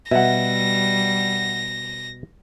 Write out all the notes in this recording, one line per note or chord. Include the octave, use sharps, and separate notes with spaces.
B2 G3 E5 F#5 A#6